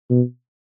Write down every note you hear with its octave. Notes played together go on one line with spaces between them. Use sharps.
B2